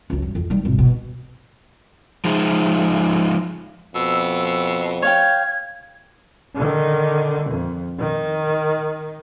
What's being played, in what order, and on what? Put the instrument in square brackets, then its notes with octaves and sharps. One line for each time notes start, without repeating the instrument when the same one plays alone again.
[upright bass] C#2 F#2
G2
F2
D#3 G3
G#1 C3
B2
[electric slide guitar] F3 G#3 D#4
[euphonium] F2 [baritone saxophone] B2 [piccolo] E6
[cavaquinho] C#5 F5 G5 [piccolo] G#6
[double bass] D3 D#3
F2
D#3